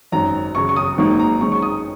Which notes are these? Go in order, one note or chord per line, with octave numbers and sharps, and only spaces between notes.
G#1 F#2 D#3 F#3 A#5
F#2 C#3 F#3 C#6
C#6
D#6
G#1 G#2 D#3 F#3 A#3 C#6
A#5
G#2 G#3 C#4 C#6
C#6
D#6